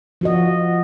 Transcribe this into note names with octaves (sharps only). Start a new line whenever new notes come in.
F3 F#4 D#5